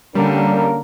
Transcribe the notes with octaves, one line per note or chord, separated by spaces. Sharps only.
D3 G3 A#3 C#4 A#4